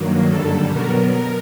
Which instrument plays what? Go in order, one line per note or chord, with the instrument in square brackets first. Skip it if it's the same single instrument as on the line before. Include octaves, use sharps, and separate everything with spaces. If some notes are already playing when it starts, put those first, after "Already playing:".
Already playing: [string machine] G2 D#3 F#3 A#3
F#2 D3 G3 A4
B2 F#3 B3 A#4
A#4